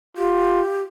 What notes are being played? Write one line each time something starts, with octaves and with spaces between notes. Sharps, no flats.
F4 G4